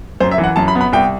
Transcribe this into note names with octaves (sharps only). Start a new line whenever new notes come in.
F#2 C5
E5
E3
F#5
F#2 A5
B5
B3
B5
C2 G5